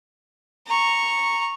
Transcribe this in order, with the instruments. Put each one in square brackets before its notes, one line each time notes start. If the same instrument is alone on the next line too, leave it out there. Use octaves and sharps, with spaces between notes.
[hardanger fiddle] A#5 C#6